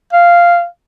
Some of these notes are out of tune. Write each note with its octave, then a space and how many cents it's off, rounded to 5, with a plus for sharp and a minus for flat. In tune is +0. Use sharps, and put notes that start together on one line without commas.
F5 -5